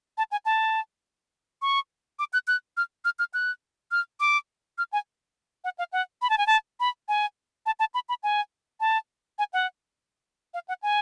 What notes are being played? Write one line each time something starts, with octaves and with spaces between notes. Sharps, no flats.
A5
G#5
A5
C#6
D6
F#6
F#6
F6
F6
F6
F#6
F6
D6
F6
G#5
F#5
F5
F#5
B5
A5
G#5
A5
B5
G#5
A5
A5
B5
B5
G#5
A5
G#5
F#5
F5
F#5
G#5